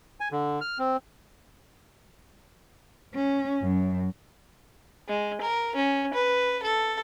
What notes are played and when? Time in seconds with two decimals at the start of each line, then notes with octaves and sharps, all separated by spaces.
0.20 G#5
0.32 D3
0.61 F6
0.79 C4
3.14 C#4
3.63 F#2
5.08 G#3
5.41 A#4
5.75 C#4
6.14 B4
6.63 A4